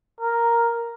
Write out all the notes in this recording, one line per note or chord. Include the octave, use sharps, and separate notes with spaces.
A#4